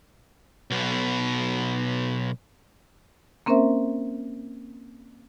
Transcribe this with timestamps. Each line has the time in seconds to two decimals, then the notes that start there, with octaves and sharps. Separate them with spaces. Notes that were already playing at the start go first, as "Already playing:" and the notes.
0.71 B1 B2
3.46 A#3 C4 C#4 A#4 C5 E5